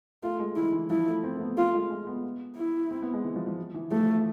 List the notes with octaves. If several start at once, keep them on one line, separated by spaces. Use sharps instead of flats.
A3 F4
G#3
E3 E4
E3
F3 E4
A3
C4
A3
B3
A3 F4
G#3
G#3
B3
E4
C4
B3
G#3
E3
F3
F3
E3
F3 A3
E3
E3